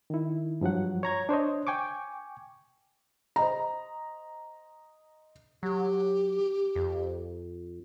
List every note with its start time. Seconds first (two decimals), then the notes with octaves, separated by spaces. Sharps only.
0.10 D#3 E4
0.61 G2 F3 F#3 F#5
1.03 C#5 A#5 G#6
1.29 D4 C5 C#5 D#5
1.67 G5 G#5 C#6 D6
3.36 C5 D#5 A#5
5.63 F#3 G4
6.75 F2